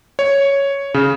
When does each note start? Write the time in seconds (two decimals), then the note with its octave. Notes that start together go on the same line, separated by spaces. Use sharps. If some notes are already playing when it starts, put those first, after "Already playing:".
0.19 C#5
0.94 C#3